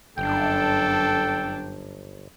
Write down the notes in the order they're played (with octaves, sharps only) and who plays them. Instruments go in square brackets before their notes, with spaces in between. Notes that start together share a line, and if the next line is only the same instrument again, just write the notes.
[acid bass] G1 [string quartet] F#2 D4 [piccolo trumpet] A4 [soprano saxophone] G5